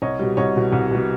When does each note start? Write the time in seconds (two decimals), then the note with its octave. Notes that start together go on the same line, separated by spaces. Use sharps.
0.02 C2 C#5 D#5
0.19 B2 G3
0.37 C2 C#5 D#5
0.55 B2 G3
0.73 C2
0.91 B2 G3